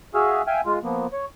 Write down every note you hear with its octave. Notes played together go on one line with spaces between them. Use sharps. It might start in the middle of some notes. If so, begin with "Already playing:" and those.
F#4 G#4 E5 F5
E5 F5 G5 G#5
G#3 F4
F3 A#3 B3
C#5